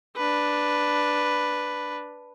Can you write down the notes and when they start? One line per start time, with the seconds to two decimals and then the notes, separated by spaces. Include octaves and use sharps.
0.17 D4 B4